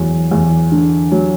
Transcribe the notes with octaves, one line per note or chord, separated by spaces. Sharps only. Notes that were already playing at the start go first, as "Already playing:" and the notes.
Already playing: E2 F#3
E2
D3
F#3